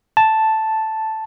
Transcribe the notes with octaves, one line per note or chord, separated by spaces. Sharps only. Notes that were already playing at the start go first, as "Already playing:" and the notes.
A5